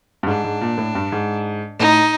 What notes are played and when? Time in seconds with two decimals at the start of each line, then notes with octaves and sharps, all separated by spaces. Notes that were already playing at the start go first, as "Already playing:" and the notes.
0.23 G2
0.27 G#2 D4
0.44 G#2
0.61 A#2
0.78 A2
0.95 G2
1.12 G#2
1.79 A2 D#4